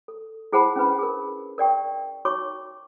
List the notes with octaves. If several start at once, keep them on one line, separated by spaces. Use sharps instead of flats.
A4
E4 G#4 C5 F#5 A5 B5
C#4 D4 B4 B5
G#4 A#4
A#4 D5 G5 C#6
D#4 F#4 C#5 C#6 D6